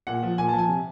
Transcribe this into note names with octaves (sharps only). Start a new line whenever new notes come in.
A#2 F#5
F3
A#2 G#5
A5
F3
G#5
C3